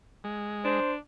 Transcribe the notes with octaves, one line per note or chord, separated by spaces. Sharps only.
G#3
D4 C5